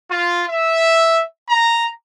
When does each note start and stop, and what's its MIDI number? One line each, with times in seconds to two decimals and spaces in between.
0.11 0.44 65
0.48 1.21 76
1.49 1.89 82